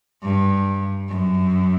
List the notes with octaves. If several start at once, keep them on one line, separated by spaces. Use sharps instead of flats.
G2
F#2